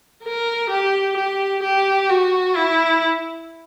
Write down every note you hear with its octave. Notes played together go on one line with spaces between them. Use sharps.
A#4
G4
G4
G4
F#4
E4